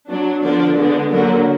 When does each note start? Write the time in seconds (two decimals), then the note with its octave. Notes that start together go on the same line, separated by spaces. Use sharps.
0.09 F#3 D4
0.42 D3 F3 B3 D4 D5
0.76 D3 G#3 B3 D4
1.10 D3 F#3 A#3 A#4